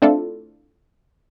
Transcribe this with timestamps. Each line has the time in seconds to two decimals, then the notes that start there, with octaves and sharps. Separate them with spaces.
0.02 A3 C4 D4 E4 F4 A4